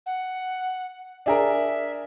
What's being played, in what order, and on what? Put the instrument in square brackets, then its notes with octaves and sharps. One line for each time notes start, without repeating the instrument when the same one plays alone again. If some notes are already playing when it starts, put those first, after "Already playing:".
[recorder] F#5
[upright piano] D4 G#4 A#4 [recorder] E5